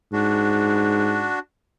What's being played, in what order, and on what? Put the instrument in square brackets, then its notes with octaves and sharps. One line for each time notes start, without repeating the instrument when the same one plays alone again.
[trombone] G#2 [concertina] D4 F#4